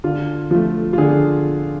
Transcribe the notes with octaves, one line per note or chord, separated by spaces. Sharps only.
D3 F4
F3 A3 F4
F4
D3 G#4